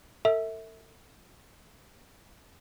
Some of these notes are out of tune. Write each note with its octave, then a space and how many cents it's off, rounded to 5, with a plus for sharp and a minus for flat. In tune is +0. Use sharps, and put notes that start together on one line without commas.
A4 +40 E5 -25